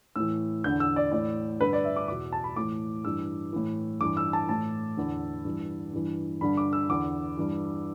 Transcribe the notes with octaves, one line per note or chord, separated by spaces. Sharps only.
A2 E3 E6
E2 D3 G6
E6
D5
A2 E3 D5
G2 D3 B4
D5
E5
D6
E2 B2 D6
A5
B5
A2 E3 D6
G2 E3 E6
A2 E3
G2 E3 D6
E6
A5
A2 E3 A5
E2 D3
G2 E3
G2 E3
G2 D3 B5
D6
E6
E2 D3 D6
G2 E3